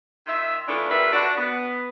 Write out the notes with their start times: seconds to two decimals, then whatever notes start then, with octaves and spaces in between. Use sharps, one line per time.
0.27 D#3 F4 E5
0.68 E3 A3 B3 D4 F4
0.90 G3 A#3 F4 B4 E5
1.13 D4 F#4
1.37 B3